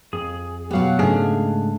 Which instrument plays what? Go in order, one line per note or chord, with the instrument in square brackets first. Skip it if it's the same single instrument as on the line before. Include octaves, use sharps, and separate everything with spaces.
[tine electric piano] F2 [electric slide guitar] G#4
[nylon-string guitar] B2 F#3 B3 [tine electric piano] G4 F5
[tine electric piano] G#2 C#3 A3 [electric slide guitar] G#3 D4 F5 [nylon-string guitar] G#4